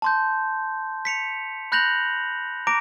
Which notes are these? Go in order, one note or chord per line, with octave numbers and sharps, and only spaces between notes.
A5 C6 G6
B6 C#7 F7
B5 F#6 G6 A#6 F7 F#7
A#5 D6 A#6 D7